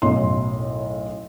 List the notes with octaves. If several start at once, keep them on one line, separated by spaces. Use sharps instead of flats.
B1 F#2 A2 C6